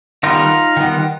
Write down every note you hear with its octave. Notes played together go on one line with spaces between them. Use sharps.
D#3 G3 B3 D#4 F4
D#3 G3 B3